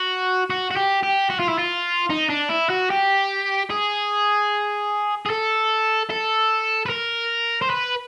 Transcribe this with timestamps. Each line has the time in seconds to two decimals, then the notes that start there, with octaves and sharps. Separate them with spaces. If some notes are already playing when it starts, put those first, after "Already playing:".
Already playing: F#4
0.50 F#4
0.71 F#4
0.77 G4
1.03 G4
1.30 F#4
1.40 F4
1.49 E4
1.58 F4
2.10 D#4
2.30 D4
2.50 E4
2.70 F#4
2.90 G4
3.70 G#4
5.26 G#4
5.30 A4
6.10 A4
6.86 B4
6.89 A#4
7.62 C5
7.70 B4